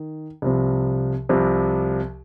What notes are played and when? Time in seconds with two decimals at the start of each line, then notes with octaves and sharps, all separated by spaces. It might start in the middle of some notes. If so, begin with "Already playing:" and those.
Already playing: D#3
0.42 C2 C3 F3
1.29 C2 C3 F3